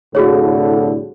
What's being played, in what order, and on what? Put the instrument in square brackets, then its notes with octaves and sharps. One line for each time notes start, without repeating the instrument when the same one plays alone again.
[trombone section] C2 A2 D3 [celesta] F#4 G#4 C#5